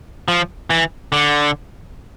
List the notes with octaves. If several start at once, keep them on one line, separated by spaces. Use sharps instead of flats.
F3
E3
D3